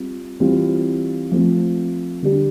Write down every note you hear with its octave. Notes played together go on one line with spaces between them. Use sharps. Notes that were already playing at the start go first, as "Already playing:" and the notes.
Already playing: G3 C4 F4
E3 G3 C4 F4
F3 A3 C4
D3 G3 D4 G4